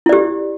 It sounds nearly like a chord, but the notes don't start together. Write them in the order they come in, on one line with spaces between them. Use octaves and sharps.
E4 D5 G4